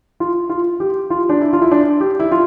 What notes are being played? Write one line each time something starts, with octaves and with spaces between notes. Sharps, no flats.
F4
F4
G4
F4
D4
E4
F4
E4
D4
G4
E4
F4